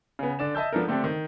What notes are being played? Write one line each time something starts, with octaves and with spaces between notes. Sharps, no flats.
C#3 B3
D3 D5 E7
D#5 E5 A5 E6 G6
F3 B3 D4 A4 A#4
D3 A3 C4 D4 G4 A4
D#3